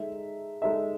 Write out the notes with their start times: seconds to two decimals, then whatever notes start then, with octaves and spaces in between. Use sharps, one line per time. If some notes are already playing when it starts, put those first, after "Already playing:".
Already playing: G#3 D#4 A4 E5
0.62 G#3 D#4 A4 E5